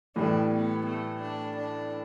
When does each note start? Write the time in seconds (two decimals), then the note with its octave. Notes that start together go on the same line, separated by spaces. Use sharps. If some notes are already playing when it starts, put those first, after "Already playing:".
0.16 A2 E3 G3 D4
0.52 B3
0.86 A3
1.22 D4
1.57 D4